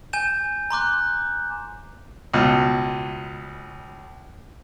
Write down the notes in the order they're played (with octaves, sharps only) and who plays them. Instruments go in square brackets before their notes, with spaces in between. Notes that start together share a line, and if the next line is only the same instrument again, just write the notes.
[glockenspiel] G#5 G6 E7
A#5 C6 D6 F#6
[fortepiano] C#2 B2